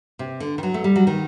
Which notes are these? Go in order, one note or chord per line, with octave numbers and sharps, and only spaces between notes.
C3
D3
D#3
F#3
A3
G3
F#3
D#3